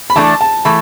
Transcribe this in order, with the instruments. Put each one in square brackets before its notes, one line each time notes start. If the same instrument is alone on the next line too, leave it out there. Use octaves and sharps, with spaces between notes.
[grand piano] B5
[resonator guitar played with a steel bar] E3 A3 D4 A4 [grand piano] A5
[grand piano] A5
[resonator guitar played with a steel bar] E3 A3 [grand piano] B5